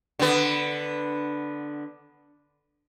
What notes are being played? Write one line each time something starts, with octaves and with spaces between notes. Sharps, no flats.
D3 B3